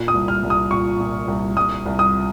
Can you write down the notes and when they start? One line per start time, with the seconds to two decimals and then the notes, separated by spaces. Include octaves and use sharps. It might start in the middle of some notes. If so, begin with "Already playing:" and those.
Already playing: A#2
0.08 D#6
0.14 C2
0.28 F6
0.44 C2
0.50 D#6
0.71 A#2 C#6
1.00 A#2
1.28 C2
1.56 C2 D#6
1.86 C2
1.99 D#6